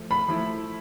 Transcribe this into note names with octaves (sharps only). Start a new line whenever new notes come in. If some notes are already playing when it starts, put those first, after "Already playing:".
Already playing: F3 A3
B5
F3 A3 E4